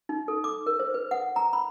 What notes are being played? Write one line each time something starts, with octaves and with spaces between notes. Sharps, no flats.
D#4
A4
D6
A#4
C5
B4
F#5
A#5
B5